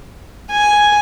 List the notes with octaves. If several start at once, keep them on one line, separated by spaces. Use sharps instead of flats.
G#5